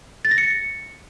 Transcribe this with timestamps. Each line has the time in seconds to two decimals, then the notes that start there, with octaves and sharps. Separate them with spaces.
0.25 A6
0.31 A#6
0.38 C#7